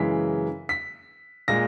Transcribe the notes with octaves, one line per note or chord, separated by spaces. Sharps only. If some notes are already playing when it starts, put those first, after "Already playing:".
Already playing: F#2 C#3 E3 G#3 B6
B6
A#2 G#3 A#6